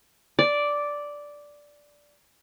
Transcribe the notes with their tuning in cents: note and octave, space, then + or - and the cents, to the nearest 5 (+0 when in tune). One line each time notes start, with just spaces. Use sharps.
D5 -5